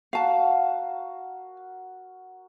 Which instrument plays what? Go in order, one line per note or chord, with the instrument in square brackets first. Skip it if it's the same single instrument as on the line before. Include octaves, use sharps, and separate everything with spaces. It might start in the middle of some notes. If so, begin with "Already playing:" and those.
[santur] F#4 A#4 F#5 [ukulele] F5 A5